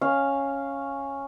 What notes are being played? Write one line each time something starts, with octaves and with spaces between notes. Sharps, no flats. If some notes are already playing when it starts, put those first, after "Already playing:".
C#4 F5